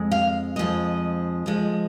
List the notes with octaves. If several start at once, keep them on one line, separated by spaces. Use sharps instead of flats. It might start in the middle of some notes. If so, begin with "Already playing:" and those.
Already playing: F2 G#3
F5
F2 F3 G#3 D#5
F2 F3 G#3